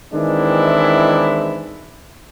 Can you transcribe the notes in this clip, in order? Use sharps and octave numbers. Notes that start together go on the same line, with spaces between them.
D#3 E3 G#3 C4 D4 E4